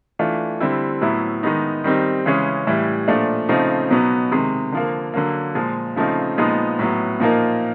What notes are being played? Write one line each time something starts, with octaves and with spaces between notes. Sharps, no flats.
E3 A3 D4 F4
D3 G3 C4 E4
A2 F#3 B3 E4
D#3 G#3 B3 D#4
D#3 G3 C4 D#4
C#3 E3 G#3 C#4
A2 E3 G3
A#2 F3 A3 D4
C#3 F3 A3 C4 D#4
B2 F#3 B3 D#4
C3 D#3 G#3
D3 F3 A#3
D3 F#3 A#3
A#2 F3 G#3
C#3 F3 A3 C4 D#4
A#2 F3 G#3 B3 D#4
A2 F#3 B3
A#2 F3 A#3 D#4